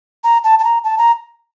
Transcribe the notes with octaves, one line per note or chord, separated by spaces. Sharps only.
A#5
A5
A5
A#5
A5
A#5